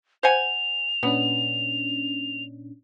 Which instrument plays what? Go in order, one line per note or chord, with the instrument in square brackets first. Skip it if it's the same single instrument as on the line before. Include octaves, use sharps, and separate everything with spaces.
[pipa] C5 F#5 G#5 [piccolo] F7
[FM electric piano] A#2 C#4 D4 [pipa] B3